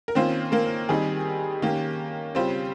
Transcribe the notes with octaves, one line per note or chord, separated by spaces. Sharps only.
A#4
D#3 A#3 C4 C#4 F4 C5
A#3 A#4
D#3 G3 C4 D#4 G#4
D#3 A#3 C#4 G4
C#3 G3 C4 C#4 F4 C5